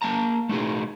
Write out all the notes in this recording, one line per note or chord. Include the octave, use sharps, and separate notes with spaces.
A#3 A5 A#5
A3 D#4 F#4 G#4